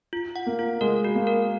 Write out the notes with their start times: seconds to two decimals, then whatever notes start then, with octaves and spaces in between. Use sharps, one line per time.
0.13 F4
0.36 F#5
0.46 A#3
0.59 F4
0.81 G#3 A#4
1.04 F#4
1.15 A#3
1.27 A#4